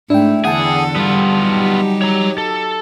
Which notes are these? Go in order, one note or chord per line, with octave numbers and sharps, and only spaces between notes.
G#2 A3 D4 E4 E5 G5
E2 D3 G#4 A4 F#5 G5 A5
G3 B3 F4
F#3 D#4 G4
C#5 A#5
A4